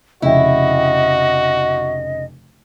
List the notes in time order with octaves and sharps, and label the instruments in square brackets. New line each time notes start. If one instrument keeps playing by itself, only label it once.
[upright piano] F1 C#3 G5 [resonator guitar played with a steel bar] E4 [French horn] F#4 [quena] D#5